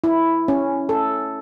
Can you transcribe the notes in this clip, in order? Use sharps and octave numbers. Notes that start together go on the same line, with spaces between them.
E4
C#4
A4